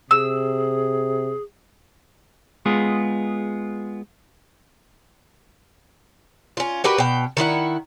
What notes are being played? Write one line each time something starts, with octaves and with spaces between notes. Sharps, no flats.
C3 G#4 E6
G#3 B3 F4 G#4
C#4 F4
F#4 G4 A#4 B4
B2 G5
D#3 E4 C5 F#5